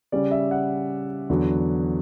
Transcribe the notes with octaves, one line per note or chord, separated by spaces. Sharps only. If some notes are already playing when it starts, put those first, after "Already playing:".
C#3 G3 C#4 D5
E5
F#5
E2 D3 F#3